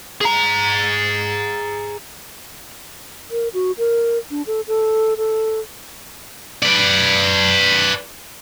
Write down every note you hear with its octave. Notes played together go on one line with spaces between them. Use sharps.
G#4 A#5
A#4
F#4
A#4
D4
A4
A4
A4
B4 D5